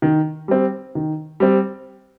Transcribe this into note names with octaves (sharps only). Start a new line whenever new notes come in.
D#3
G3 C4
D#3
G3 C4